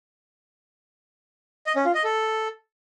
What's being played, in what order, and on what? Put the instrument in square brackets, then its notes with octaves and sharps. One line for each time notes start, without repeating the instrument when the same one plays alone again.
[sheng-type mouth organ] D#5
C#4
F4
D#5
A4